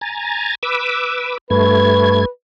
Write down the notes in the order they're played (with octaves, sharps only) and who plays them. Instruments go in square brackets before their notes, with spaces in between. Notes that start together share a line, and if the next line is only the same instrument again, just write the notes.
[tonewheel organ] G#5 A#5 A6
B4 D6 E6
[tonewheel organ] G2 A3 G#6 [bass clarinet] B4